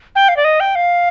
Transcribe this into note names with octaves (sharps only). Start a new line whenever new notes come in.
G5
F5
D5
D#5
G5
F5